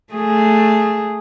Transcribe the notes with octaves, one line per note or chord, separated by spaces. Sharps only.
A3 G#4